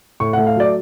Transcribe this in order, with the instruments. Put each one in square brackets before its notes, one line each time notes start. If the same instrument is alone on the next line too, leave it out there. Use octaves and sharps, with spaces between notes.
[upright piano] A2 C#6
F#5
A3
F5
F#3 D5